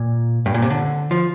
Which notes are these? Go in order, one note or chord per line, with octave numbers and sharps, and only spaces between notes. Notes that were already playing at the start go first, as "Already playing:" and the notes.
Already playing: A#2
G2
A#2
C3
D3
F3